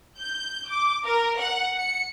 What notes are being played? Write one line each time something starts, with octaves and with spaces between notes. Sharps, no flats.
G6
D6
A#4
F#5
C#7